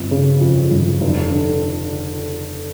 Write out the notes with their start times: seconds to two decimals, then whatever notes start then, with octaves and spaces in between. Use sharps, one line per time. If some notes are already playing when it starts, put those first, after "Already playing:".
Already playing: G1 C4
0.11 C#3
0.41 F2
0.71 G1
1.01 F1
1.31 D3